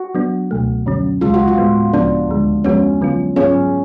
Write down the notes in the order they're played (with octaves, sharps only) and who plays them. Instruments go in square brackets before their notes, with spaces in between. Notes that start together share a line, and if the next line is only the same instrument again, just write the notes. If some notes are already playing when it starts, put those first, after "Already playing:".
Already playing: [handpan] F#4
[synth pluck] F#3 B3 D4
C#2 B2 A3
F2 D3 F#3 C#4
[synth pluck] D2 C#3 G#3 [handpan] F4
[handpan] F#4
F4
[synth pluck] A2 G#3 B3
[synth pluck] C#2 C#3 F3 B3 [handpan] D4
[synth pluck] D2 D3 G#3
[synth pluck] F2 F3 G#3 B3 F#4 [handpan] C#4
[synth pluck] D3 F#3 B3 F4
[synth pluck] G#2 F#3 B3 F4 G#4 [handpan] C#4